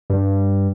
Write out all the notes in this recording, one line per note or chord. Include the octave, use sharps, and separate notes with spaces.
G2